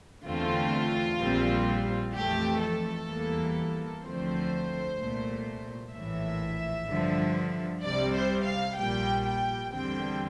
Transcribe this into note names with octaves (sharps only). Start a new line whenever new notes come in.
E2 D3 A3 C4 F4
A#1 A#2 G3 C4
F2 E3 A3 G4
A4
E2 E3 G3 A#3
D2 D3 F3 A3 C4 C5
C2 A#2 A3
A#1 A2 E3 E5
G2 D3 F3
C2 C3 G3 D5
C5
F5
A#1 A#2 G3 G5
G5
E2 D3 G3 C4 G5